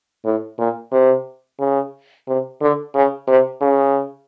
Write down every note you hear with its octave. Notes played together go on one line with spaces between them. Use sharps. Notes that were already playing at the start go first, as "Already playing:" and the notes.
A2
A#2
C3
C#3
C3
D3
C#3
C3
C#3